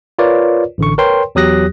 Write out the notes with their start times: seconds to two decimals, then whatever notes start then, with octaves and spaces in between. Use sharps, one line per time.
0.19 F4 A#4 B4 C#5 D5
0.78 A1 D3 C#6
0.98 A#4 B4 C#5 G5 C6
1.35 E2 F#3 G4 D#6 F#6 A#6